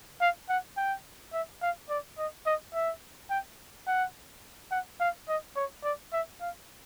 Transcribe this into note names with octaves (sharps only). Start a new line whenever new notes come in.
F5
F#5
G5
E5
F5
D5
D#5
D#5
E5
G5
F#5
F#5
F5
D#5
C#5
D5
E5
F5